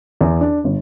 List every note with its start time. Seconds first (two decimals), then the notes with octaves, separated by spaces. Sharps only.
0.21 E2
0.41 D4
0.64 G1